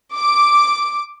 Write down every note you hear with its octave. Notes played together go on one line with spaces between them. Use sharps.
D6